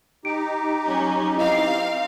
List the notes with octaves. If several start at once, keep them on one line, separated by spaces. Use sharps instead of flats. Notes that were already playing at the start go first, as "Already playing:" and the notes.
D#4 G4 D7
F#3 C#4
C4 E4 D#5 F5